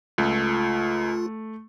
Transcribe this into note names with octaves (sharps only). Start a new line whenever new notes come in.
C#2 A3 F4